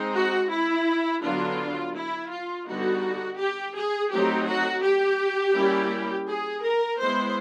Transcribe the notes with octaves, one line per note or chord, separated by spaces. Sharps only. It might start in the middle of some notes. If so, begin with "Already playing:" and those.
Already playing: G#3 C4 D#4
F#4
E4
D3 F#3 B3 D4 F4
E4
F4
D3 G3 B3 D#4 F#4
G4
G#4
F#3 A3 C4 D#4 G4
F#4
G4
G3 A#3 C#4 E4
G#4
A#4
G#3 B3 E4 C5